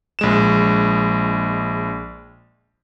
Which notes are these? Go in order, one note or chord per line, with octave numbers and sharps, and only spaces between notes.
A#1 G#3 E7